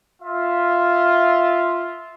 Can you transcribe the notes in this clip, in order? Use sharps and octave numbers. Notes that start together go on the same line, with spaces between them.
F4 E5